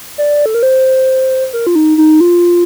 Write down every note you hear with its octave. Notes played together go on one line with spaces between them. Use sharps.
D5
A4
A#4
C5
A#4
F4
D#4
D#4
F4